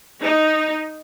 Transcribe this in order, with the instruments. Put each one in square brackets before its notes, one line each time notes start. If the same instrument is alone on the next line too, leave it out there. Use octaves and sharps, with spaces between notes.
[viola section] D#4